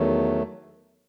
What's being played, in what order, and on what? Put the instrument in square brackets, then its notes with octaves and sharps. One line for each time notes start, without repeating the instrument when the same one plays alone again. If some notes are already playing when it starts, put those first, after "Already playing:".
Already playing: [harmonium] E2 D#3 F#3 A3